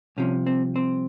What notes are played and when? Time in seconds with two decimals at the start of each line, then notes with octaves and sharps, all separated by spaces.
0.17 C2 C3 F3 C#4
0.47 C4
0.76 C4